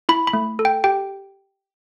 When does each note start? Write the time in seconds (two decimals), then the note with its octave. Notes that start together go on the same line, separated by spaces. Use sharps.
0.09 E4 B5
0.27 B5
0.33 A3
0.59 A4
0.65 G5
0.84 G4 G5